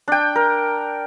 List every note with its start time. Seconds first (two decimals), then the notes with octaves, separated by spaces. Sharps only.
0.08 D4 G5
0.35 A#4